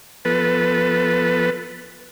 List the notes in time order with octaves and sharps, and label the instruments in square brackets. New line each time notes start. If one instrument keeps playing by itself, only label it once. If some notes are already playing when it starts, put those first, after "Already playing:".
[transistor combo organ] F3 B3 A4 B4